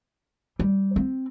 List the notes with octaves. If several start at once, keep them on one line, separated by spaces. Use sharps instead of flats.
G3
C4